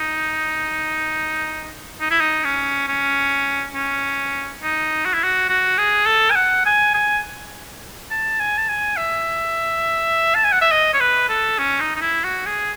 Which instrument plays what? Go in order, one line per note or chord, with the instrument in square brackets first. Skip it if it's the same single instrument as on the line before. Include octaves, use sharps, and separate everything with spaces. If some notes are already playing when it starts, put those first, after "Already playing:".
Already playing: [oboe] D#4
D#4
E4
D#4
C#4
C#4
C#4
D#4
F#4
E4
F#4
F#4
G#4
A4
G#5
F#5
G#5
G#5
A5
G#5
A5
G#5
E5
A5
G#5
F#5
E5
D#5
C#5
B4
A4
C#4
D#4
D#4
E4
F#4
G#4